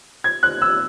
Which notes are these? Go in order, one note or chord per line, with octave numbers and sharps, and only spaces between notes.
G#6
F#6
E6